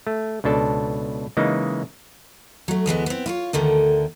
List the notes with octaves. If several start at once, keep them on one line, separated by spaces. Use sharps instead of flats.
A3
C#2 B2 D4 A4
C#3 E3 G#3 A#3 D#4
F#3 A3
D2 E3 G#3 B3
B3 C4
E4 F4 C#5
D2 D3 D#3 A3